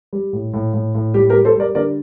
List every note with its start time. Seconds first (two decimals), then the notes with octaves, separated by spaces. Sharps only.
0.13 G3
0.33 A2
0.54 A2
0.74 A2
0.95 A2
1.14 G3 G4
1.30 G4 A#4
1.34 G3
1.45 A4 C5
1.55 G3 A#4 D5
1.75 D3 A#4 D5